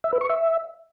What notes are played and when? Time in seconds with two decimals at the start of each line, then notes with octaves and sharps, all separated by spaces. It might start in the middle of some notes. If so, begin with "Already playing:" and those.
0.04 E5
0.13 B4
0.21 C#6
0.30 E5